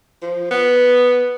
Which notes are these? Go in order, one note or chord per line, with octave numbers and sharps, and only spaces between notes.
F3
B3